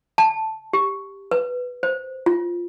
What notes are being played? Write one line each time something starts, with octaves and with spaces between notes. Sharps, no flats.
A5
G4
B4
C5
F4